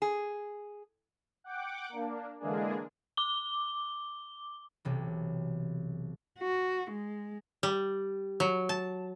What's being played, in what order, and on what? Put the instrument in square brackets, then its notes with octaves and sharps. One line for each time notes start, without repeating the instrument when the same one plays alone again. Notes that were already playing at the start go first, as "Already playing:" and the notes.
[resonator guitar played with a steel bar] G#4
[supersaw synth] F#5 G5 D6
A#3 D4
D3 E3 G#3 A#3 D4 G#4
[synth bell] D6 G7
[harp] B1 C3 E3
[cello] F#4
G#3
[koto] G3
F#3
A5